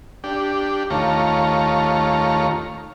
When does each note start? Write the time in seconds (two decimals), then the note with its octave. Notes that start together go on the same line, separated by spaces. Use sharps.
0.24 D4 G4
0.90 D#2 A3 F4 C#5 A#5